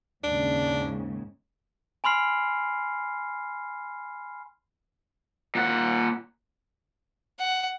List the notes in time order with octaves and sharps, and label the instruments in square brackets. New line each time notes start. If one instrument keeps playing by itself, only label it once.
[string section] D#2 G#2 C#3 [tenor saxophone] D4
[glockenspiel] G#5 B5 C6 F6 C7
[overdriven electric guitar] A#2 F#5
[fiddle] F#5